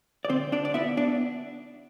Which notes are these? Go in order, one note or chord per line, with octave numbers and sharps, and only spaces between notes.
D5
D3 C4 C5
D4 D5
D5
B3 E4 E5
D4 D5